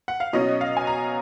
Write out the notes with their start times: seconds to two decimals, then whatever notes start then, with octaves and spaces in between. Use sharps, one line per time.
0.08 F#5
0.20 F5
0.33 B2 F#3 C#4 D#5
0.61 F5
0.77 G#5
0.87 A#5